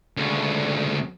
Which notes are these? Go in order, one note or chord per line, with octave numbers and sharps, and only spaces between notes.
D2 C#3